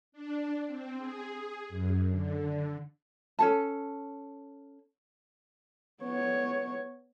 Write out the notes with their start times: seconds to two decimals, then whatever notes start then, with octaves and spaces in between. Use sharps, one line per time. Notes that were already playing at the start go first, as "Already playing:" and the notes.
0.12 D4
0.67 C4
0.97 G#4
1.69 F#2
2.09 D3
3.39 C#4 A4 A5
6.02 B3 C#5